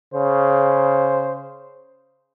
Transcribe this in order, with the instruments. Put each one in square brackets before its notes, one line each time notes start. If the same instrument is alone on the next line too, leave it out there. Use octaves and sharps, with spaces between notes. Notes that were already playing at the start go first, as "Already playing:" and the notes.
[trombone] C#3 [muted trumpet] C5